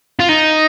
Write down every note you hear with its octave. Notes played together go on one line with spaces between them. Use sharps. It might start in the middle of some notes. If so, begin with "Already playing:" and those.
F4
D#4